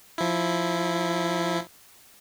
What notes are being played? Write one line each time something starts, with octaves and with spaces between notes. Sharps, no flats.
F3 E4